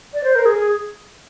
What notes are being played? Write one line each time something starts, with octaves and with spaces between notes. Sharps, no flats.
D5
C5
A#4
G#4